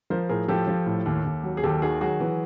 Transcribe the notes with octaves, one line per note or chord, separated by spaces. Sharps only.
F3 A#4 C5
A2 G#4 A#4
F3 G4 A4
F3
A2
D#2
D#2
F#3
G#4
D#2 G4 A4
D#3 F#4 G#4
F#3 F#4 G#4
E3